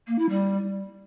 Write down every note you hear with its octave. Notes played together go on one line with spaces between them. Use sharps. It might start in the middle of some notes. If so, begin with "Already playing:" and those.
A#3
E4
G3